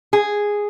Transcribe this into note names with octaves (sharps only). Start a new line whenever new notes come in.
G#4